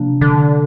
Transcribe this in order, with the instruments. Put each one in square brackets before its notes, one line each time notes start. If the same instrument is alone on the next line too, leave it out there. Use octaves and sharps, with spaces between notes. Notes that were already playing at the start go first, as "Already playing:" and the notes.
Already playing: [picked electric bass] C3 F3 A#3 D4
[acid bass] D3